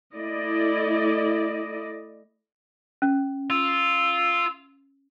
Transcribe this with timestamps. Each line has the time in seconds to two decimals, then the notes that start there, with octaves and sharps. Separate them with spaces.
0.15 A3 E4 D5 D#5
3.02 C#4
3.50 F4 E6